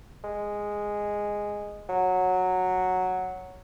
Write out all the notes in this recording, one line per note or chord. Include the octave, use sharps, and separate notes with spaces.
G#3
F#3